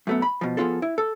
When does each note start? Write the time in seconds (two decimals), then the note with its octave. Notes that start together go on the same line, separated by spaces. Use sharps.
0.07 F#2 A3 B3
0.22 B5
0.41 B2 F3
0.57 F3 F#3 B3 F4 G#4 A4
0.82 E4
0.98 A4